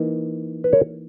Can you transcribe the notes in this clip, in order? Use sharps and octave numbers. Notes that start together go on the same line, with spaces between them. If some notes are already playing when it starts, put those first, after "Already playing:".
Already playing: E3 A#3 D#4
B4
A#4 C#5